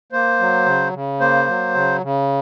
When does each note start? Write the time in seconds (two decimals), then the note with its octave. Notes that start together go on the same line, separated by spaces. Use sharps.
0.12 A#3 C5
0.40 F#3
0.66 C#3
0.94 C#3
1.20 A#3 C5
1.48 F#3
1.75 C#3
2.03 C#3